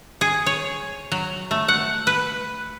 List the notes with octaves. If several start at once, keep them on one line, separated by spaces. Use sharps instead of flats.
G#4
C#5
F#3
A3
F#5
B4